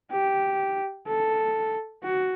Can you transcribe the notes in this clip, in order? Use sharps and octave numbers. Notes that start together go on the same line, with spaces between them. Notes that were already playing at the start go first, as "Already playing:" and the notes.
G4
A4
F#4